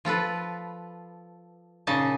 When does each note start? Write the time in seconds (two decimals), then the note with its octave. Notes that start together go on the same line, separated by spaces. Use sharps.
0.05 F3 F4 A4 B4
1.87 A#2 C#3 D#4 A5